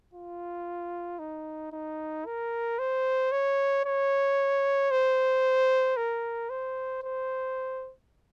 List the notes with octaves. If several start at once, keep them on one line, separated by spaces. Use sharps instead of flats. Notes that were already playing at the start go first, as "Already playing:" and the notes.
F4
D#4
D#4
A#4
C5
C#5
C#5
C5
A#4
C5
C5